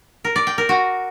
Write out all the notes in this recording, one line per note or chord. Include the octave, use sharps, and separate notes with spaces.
A#4
D5
G5
A#4
F#4